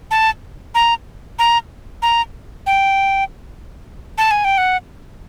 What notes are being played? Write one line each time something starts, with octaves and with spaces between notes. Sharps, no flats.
A5
A#5
A#5
A#5
G5
A5
G#5
G5
F#5